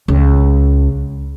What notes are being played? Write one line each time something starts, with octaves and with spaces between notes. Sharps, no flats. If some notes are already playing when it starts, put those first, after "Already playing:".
C#2